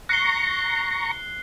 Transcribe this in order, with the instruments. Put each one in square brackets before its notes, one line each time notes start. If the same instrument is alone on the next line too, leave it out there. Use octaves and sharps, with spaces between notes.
[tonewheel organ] A#5 C#6 [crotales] F#6 C7 G7